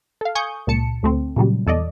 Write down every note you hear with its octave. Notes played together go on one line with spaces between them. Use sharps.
A4 F5
G#5 C#6 D#6 G6
C#2 A#2 A5 C#7
D2 A3 C4
A#2 C#3 F#3 G3
E2 A4 D5 D#5